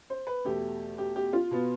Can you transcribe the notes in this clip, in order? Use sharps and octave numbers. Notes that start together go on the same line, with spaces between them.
C5
B4
E2 B2 A3 G4
G4
G4
F4
B2 B3